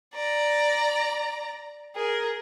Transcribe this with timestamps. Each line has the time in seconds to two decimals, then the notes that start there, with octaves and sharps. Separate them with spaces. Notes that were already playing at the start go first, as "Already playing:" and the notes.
0.15 D5 A#5
1.96 G#4 A#4